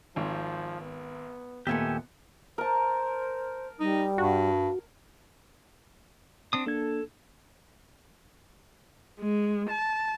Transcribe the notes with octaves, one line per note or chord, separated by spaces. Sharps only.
G#1 F3
B3
D#2 A#2 A3 B3 G4 E5 G#5
A#4 C5 A5
G3 D#4
G2 F#4
C4 D4 D#6
A#3 D4 A4 G#6
G#3
A5